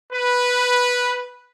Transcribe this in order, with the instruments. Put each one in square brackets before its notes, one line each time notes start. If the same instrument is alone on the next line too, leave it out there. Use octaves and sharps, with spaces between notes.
[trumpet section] B4